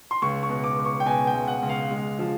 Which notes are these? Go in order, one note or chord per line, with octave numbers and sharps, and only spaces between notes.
C6
C#2 C#6
C#6
B2
D6
C#2
C#6
G5
B2 G#5
G5
C#2
F#5
C#2
F5
G#3
F3